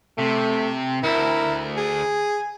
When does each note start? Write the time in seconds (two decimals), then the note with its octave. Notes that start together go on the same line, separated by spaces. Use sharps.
0.18 C3 A3
1.04 D2 E4 A#4
1.77 G#4 G#5